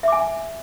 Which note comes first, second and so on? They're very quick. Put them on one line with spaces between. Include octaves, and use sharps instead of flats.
E5 D6 G#5